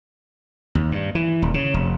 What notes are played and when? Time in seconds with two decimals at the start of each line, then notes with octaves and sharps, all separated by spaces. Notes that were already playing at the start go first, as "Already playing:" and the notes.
0.75 D#2
0.92 G2
1.15 E3
1.42 D#1
1.54 C#3
1.74 F1